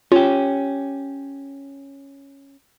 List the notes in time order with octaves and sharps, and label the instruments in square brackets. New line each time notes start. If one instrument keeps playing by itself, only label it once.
[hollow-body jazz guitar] C#4 G4 [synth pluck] F4